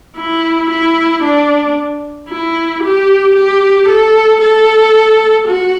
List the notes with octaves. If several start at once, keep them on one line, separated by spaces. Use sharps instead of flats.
E4
E4
D4
E4
G4
G4
A4
A4
F#4